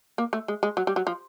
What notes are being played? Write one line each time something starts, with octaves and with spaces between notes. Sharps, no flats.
A#3
A3
G#3
G#3
F#3
G3
F#3
F3